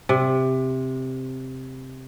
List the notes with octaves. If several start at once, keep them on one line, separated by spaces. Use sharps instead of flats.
C3